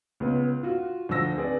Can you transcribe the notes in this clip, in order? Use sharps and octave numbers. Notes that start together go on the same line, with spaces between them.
C#2 B3
F4 F#4
D2 F3 C5 E6 A#6
C4 G#4 B4 D5